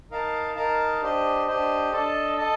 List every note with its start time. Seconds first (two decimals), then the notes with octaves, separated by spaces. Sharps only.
0.11 D#4 A#4 F5 A5
0.56 D#4 A#4 F5 A5
1.01 D4 G4 C5 D#5
1.47 D4 G4 C5 D#5
1.92 D4 A4 D#5 A5
2.38 A4 D#5 A5